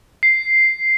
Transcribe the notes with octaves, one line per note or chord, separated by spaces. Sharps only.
C7